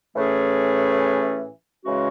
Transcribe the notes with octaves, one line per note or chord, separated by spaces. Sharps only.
A2 E3 A3 C#4 G#4
C#3 E3 G#3 C#4 F#4